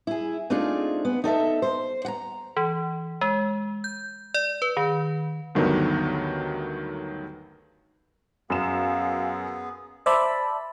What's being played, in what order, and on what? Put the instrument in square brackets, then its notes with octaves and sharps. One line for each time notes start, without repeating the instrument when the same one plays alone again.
[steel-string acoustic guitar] E4 G#4
A3 C4 D4 D#4 F4 G#4
B3
D#4 A4 D5 E5
C5
F#5 A#5
[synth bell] E3
G#3
G6
D5
B4
D#3
[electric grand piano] D2 G2 D#3 F#3 A3 B3
[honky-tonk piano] F#2 E7 [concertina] B3 G#4 [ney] F5
[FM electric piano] C5 D5 E5 A5 B5